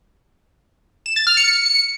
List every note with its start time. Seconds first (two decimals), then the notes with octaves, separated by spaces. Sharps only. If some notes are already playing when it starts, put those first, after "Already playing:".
1.06 E7
1.16 A6
1.27 F6
1.37 C#7